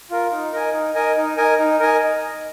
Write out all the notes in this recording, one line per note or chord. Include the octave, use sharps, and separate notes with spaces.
F4 A#4
D#4
A#4 D#5 G#5
D#4
A#4 D#5 G#5
D#4
A#4 D#5 G#5
D#4
A#4 D#5 G#5